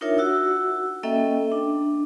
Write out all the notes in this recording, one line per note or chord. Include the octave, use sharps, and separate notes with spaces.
D4 D#4 F4 A#4 C#5 E5
F#4 F#5 E6
A#3 C#4 A4 D#5 E5 G5
D4